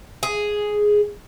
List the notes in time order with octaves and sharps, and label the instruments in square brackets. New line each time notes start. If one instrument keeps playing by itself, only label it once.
[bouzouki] G#4